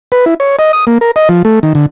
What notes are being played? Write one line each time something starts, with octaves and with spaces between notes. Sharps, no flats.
B4
E4
C#5
D#5
D#6
A#3
A#4
D#5
F3
A3
D#3
D3